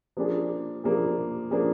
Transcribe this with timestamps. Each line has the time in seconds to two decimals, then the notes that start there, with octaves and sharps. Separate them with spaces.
0.17 F3 A#3 D4 G#4
0.84 F3 A#3 D4 G#4
1.51 F3 A#3 D4 G#4